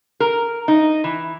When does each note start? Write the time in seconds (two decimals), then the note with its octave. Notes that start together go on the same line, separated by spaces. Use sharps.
0.20 A#4
0.68 D#4
1.04 E3